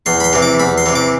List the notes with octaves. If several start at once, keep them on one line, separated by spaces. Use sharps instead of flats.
E2 C6
B5
C6
C3 E3
D6
E2 B5
C6
C3 E3
D6